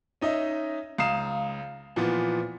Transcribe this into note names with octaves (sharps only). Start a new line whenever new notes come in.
C#4 D#4 D#5 E5
C#2 F5 A#5 D#6 C7 E7
A#2 E3 F3 B3